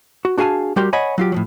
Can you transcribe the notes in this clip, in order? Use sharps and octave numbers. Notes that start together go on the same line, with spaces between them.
F#4
D4 F#4 G#4 F5 G#5 A5
G3 F#4 G4 A#4 C6
C#5 D#5 F#5 G#5 B5
F#3 F4 G4
A2 F3 F#3